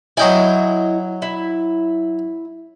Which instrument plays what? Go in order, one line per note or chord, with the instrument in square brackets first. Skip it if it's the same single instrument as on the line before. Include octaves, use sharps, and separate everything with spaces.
[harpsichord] F#3 G5 G#5 [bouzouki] E4 D#5
[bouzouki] E4